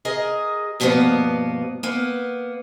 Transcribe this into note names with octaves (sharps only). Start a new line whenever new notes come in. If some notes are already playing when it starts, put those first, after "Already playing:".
G#4 A#4 D#5
G2 B2 F3 G3 A#3 B3
A#3 B3